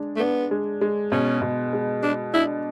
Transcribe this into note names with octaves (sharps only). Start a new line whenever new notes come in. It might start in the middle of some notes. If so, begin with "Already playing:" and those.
Already playing: G#3 D4
A3
B3 D4
G#3
G#3
B2 C#4
B2
G#3
G#3 D4
D4 E4